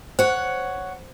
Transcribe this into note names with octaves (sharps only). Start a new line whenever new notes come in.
C5 C#5 F#5